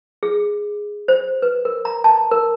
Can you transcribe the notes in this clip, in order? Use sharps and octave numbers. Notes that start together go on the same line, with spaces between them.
G#4
C5
B4
A#4
A#5
A5
A#4